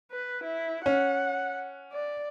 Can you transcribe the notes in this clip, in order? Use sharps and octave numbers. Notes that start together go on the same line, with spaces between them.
B4
E4
C#4 F#5
D5